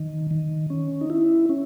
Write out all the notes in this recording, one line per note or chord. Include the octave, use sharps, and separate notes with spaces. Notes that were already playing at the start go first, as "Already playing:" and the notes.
Already playing: D#3
D#3
C#4
D#4
E4
C#4